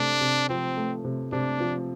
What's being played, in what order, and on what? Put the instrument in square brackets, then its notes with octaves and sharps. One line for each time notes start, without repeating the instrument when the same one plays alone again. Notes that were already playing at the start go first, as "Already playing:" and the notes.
Already playing: [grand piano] C3 A3 [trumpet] D4
[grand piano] C3
[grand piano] F3 [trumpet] C4
[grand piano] A3
C3
[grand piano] C3 [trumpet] D4
[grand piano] F3